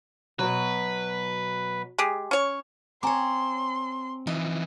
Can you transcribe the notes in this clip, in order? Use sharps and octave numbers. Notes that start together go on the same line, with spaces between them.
B2 F#3 B4
G#3 G4 G#4
C#4 C#5
C4 C#5 G#5 A#5 C6 D6
E3 F3 D#4